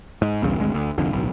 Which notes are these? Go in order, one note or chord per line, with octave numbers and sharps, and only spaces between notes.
G#2
B1 E2 G2 C#3
G#1 D2 G#3
D2
C2 F2 D3
D1 B1